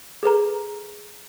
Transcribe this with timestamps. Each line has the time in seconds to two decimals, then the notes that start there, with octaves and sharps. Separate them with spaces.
0.23 G#4 A4 B4 A#5